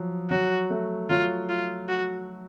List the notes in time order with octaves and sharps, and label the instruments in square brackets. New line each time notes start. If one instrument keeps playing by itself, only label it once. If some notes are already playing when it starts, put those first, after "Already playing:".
Already playing: [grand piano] F3 F#3
[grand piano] F#3 [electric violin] F#4
[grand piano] A3
[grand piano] F#3 [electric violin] F4
[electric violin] F4
F#4